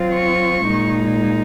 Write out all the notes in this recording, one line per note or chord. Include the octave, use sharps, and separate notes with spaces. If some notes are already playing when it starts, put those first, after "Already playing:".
Already playing: F#3 C4 F4
C#6
A#2 G#3 D#4